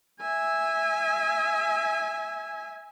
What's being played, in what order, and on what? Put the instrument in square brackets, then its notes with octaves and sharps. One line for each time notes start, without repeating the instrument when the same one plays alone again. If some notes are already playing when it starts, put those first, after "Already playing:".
[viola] E5 G#5